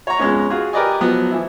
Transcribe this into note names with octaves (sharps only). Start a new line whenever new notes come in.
C#5 F#5 A#5
F2 G#3 B3 C#4
F4 F#4 G#4
G4 A#4 B4 D5 D#5 G#5
F3 F#3 B3
E3 F3 E4